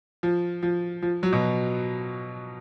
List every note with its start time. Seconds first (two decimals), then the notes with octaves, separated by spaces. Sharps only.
0.23 F3
0.63 F3
1.02 F3
1.23 F#3
1.33 B2